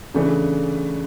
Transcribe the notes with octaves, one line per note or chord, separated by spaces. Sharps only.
C#3 E3 A3 D4